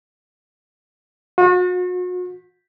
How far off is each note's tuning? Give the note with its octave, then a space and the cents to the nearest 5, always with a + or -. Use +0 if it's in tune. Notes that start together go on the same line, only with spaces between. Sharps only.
F#4 -40